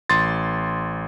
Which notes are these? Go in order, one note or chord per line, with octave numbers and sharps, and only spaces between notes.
A1 C6 A6